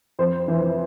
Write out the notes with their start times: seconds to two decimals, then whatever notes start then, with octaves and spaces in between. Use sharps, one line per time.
0.19 F2 C5
0.48 E3